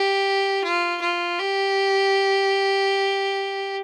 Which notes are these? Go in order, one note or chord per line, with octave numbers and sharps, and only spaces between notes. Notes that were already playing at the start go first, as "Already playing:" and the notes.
Already playing: G4
F4
F4
G4